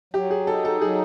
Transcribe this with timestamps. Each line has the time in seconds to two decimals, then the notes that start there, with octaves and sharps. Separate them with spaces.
0.14 F#3 G4
0.31 G#4
0.47 D#4 A4
0.65 A4
0.81 F#3 G#4